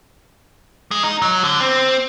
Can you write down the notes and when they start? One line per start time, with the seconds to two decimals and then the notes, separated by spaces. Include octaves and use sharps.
0.91 G#3
1.03 D#4
1.22 F#3
1.44 D3
1.60 C4